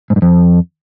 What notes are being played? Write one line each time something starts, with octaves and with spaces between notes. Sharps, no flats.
G#2
G2
F2